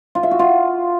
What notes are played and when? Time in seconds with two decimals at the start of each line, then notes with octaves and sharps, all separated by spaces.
0.15 F4
0.23 E5
0.31 F#4
0.39 F4